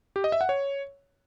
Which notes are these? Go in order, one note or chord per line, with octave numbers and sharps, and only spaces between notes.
G4
D#5
E5
F#5
C#5